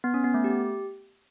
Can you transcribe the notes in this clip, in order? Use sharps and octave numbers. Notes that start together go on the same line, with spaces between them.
B3
C#4
B3
A3
G4